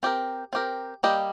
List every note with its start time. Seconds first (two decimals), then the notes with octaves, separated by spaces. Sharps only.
0.03 C4 G4 A#4
0.53 C4 G4 A#4
1.03 G3 A#3 G4 D#5